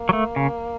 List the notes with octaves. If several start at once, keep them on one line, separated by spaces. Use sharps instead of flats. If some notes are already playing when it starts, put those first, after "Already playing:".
Already playing: A#3
F#3
A3
C#3